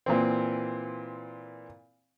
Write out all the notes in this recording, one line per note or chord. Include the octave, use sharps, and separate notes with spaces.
A#2 E3 C4